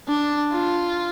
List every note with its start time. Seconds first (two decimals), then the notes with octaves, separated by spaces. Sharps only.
0.08 D4
0.51 F4